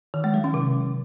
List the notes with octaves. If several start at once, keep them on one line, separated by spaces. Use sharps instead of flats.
D#3
G#3
F#3
C#4
C3